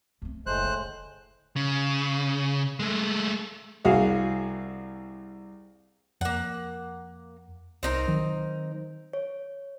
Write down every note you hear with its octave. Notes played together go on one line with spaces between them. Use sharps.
A3 C4
F#1 A2 G#3 A3 C5 F#6
D3
C#3
G#3 A3
C2 F#4 G#4 F5
F2 A#3 F#5
C2 C4 D#4 A#4
D#3 F#3
C#5